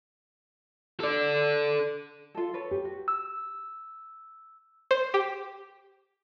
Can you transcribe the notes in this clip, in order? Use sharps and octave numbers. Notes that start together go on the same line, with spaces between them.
A4 D5
F4 A4
A4 B4 C#5
G4
F#4
E6
C5
G4